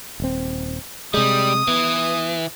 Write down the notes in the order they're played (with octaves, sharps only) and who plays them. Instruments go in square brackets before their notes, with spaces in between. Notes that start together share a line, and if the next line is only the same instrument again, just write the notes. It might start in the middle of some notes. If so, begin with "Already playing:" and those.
[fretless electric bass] D#1 C4
[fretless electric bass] C3 G#3 [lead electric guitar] G3 [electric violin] D#6
[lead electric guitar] E3 [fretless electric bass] B3